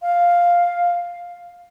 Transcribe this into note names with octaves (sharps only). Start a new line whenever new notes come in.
F5